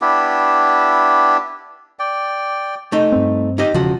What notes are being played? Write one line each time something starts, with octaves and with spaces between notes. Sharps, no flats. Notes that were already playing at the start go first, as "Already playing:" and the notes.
B3 D4 E4 G4
D5 G5
A3 D#4
G2 C4
D#4 G4 D#5
E1 C#3 F3 F#4